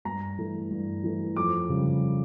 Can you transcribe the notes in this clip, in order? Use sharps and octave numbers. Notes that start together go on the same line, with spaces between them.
G2 A#5
E3 A3
G2
E3 A3
F2 D6
C#3 G3